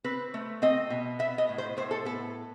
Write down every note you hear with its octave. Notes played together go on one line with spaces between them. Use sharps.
C4 B4
A3
C4 D#5
B2
B3 E5
D#5
A2
C5
A2 C5
A4
B3 A4